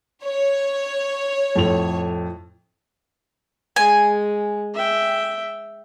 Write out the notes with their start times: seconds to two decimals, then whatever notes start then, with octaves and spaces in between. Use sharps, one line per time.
0.25 C#5
1.56 F2 A2 F7
3.76 G#3 G#5
4.74 E5 G5